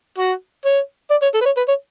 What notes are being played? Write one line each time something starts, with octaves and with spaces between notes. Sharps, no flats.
F#4
C#5
D5
C#5
A4
B4
C#5
B4
C#5